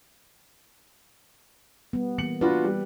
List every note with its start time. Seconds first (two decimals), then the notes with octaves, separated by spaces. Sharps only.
1.93 G3 B3
2.18 E3 A#3 B3 C#7 F#7
2.41 D4 F4 F#4 B4
2.64 G3